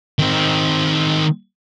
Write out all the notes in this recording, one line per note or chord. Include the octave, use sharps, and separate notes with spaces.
D#3 C4